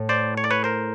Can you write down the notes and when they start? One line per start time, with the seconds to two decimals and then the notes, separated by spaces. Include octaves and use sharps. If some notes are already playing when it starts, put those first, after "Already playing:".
Already playing: A2
0.09 C5 D5
0.37 C#5
0.44 D5
0.51 B4 C#5
0.64 A#4 C5